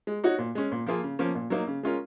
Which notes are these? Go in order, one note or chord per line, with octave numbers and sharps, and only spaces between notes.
G#3
D#4 F#4 C#5
A#2
G#3 C#4
A#2
F3 A#3 F4 G#4
C#3
F3 A#3 C#4
A#2
F#3 A#3 D#4
C#3
G#3 C#4 F4 A#4